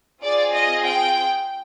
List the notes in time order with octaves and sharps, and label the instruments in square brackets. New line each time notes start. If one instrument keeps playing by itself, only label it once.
[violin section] C4 F4 G#4 D5
D#5
G5